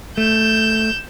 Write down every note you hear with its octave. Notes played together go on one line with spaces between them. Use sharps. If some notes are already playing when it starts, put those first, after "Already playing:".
A3 G6 E7